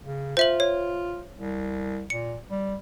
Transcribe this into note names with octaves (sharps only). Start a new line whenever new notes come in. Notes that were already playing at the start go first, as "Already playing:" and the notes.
C#3
F4 C5 E5 F#7
C#5
C2
A#2 C#7
G3